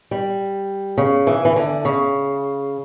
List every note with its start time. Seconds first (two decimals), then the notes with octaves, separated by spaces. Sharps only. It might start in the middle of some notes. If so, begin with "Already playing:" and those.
0.11 G3
0.98 C#3
1.27 E3
1.45 E3
1.56 D3
1.85 C#3